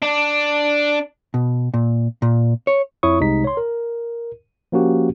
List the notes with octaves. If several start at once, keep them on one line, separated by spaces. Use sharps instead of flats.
D4
B2
A#2
A#2
C#5
F2 E4 C#5 C#6 D#6
C2 C3 G#3 D#4 B6
C#5 C6
A#4
F3 A#3 C#4 F#4 G4